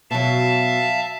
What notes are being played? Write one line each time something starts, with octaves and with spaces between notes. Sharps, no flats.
B2 F#3 E5 F5 A5